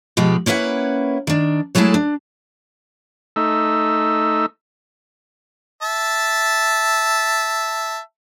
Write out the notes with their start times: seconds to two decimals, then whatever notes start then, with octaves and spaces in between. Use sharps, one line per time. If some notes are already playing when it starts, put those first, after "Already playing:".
0.17 B2 F3 G#3 G4
0.46 A#3 C#4 E4 B4 F#5
1.27 D#3 D4
1.75 F#3 G#3 A3 E4 G#4 A5
1.94 D4
3.36 A3 D#4 E5
5.82 E5 A5